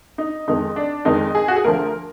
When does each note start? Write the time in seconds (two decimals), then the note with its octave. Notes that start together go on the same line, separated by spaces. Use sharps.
0.18 D#4
0.48 F2 D#3 G#3 D#4
0.76 D4
1.05 F2 D#3 G#3 D#4
1.35 G#4
1.48 F#4
1.56 G#4
1.64 D2 D3 F3 A#4